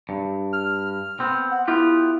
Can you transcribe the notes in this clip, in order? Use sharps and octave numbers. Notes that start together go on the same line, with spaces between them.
G2
F6
B3 C4
F#5
B3 E4 F4 G4